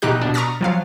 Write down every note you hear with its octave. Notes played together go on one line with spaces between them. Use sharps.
B2 E3 D#4 G4 F#6
B2 D4
A#5 C#6 D#6 F6 A6 B6
F3 F#3 F5